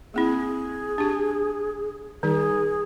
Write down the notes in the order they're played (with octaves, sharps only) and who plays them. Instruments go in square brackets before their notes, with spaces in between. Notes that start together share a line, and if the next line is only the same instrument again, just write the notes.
[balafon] A#3 C4 E4 [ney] G#4
[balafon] D4 G4
[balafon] D#3 G3 D#4 [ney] G#4